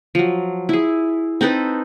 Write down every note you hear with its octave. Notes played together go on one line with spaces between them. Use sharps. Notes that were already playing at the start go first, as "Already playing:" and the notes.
F3 F#3
E4 G#4
C4 D#4 A4 B4